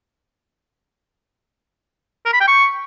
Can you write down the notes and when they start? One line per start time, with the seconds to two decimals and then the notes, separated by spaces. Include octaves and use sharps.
2.26 A#4
2.33 B5
2.40 G5
2.48 C#6